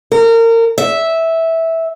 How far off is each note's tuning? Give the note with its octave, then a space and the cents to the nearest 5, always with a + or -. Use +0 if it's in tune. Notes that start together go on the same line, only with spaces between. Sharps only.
A#4 -30
E5 -10